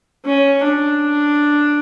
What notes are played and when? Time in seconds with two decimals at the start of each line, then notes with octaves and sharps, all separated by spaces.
0.25 C#4
0.64 D4